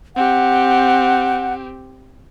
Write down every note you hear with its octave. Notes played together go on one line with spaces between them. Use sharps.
C4 G4 F#5